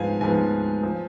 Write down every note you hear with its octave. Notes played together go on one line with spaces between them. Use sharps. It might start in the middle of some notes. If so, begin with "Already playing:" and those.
Already playing: G#2 F3 B3 F5 G#5
G#2 F3 B3 G#5
F3